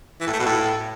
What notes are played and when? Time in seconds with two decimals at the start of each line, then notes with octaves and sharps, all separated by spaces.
0.20 E3
0.27 A2
0.33 A3
0.40 B2
0.46 A2